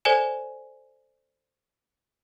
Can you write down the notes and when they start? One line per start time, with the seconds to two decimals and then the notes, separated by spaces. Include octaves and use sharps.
0.05 A4 C5 D5 G#5 E7